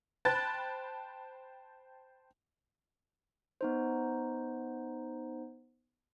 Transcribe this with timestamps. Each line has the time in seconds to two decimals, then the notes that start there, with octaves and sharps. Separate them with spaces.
0.25 C5 G5 A5 B5 F#6 A6
3.61 B3 D#4 C5